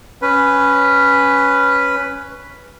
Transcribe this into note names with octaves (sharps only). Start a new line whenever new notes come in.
C#4 B4